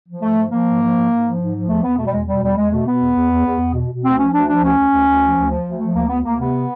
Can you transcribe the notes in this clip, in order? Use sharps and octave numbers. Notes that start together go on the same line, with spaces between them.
F3
G#2 A3
F3
F3 A#3
G#2
F3
G#2
G#2
F3
G#2
F3
E2 A3
E2 B3
B2 A3
G3
E2 G#3
B2 G3
E2 G3
E2 G#3
B2 A3
B2 B3
E2
E2
E2
E2
E2
B2
B2
D2 C4
F3 C#4
D2 D4
F3 D4
D2 C#4
D2
D2
D2
F3
D2
F3
D2
F3 A3
D2 A#3
D2 B3
D2 A#3
C3 B3